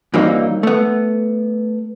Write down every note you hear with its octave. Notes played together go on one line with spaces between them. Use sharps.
G2 E3 F#3 A#3 C4 D#4
A3 B3